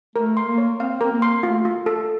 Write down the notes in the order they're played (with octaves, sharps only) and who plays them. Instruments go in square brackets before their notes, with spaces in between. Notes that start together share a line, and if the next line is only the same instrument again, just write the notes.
[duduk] A3 [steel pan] A#4
[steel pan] C6
[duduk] A#3
[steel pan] C#5
[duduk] C4 [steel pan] F5
[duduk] C4 [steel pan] A#4
[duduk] A#3
[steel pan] C6
[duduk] A3 [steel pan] F4
[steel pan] F4
A4